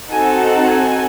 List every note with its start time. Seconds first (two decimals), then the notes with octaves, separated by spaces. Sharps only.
0.11 C4 D#4 F#4 A4 G#5
0.68 G#5